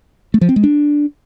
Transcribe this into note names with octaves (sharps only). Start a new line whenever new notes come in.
A3
F3
C4
G#3
D4